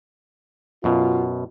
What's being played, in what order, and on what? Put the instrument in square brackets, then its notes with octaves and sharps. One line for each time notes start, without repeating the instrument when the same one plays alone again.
[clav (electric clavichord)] F#2 B2 [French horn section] F4 F#4